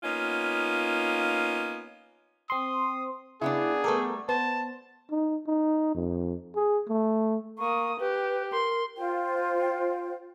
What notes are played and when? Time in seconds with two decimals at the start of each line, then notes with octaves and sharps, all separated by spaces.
0.03 A#3 B3 C#4 D#4 F4
2.50 C4 C6 D#6
3.41 C#3 B3 D4 E4 G#4
3.84 G3 A3 B3 A4 A#4
4.29 B3 C5 A5
5.11 D#4
5.47 D#4
5.95 F2
6.55 G#4
6.88 A3
7.59 A#3 C#6 D#6
8.00 G4 B4
8.53 A#4 C6
8.96 F4 C5 G5